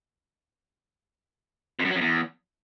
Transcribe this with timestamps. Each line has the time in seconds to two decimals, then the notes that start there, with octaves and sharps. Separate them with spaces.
1.79 F2
1.85 F#2
1.90 F#3
1.96 F2
2.01 E2